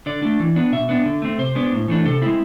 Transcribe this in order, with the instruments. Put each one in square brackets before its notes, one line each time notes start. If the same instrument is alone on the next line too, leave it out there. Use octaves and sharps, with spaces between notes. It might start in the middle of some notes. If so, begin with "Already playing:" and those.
[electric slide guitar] D3 D5
A3 D4
E3
B3 D4
B2 E5
B3 D4
D3
A3 C4
C3 C5
G#3 B3 D4
A2
E3 A3 D4
C3 A4
G#3 C4 E4